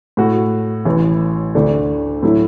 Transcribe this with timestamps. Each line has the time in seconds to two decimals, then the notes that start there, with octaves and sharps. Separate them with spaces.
0.17 A2 A3 F#4
0.85 A1 A2 E3
1.55 D2 D3 A3 D4
2.23 A2 F#3 A3 E4